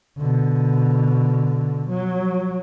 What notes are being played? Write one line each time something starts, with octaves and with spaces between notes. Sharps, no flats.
B2 D3
F#3